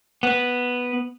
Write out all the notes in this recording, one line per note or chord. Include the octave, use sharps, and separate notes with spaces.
B3